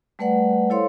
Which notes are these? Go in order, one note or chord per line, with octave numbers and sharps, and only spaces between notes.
G3 A3 B4 D5 F#5
E4 A4 C5 C#5 F5 C6